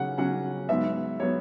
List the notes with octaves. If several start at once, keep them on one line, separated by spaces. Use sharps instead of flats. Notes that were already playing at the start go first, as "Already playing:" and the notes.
Already playing: C#3 F#3 C#4 F#5
C#3 F#3 C#4 F#5
G#2 F#3 B3 E5
F#3 B3 C#5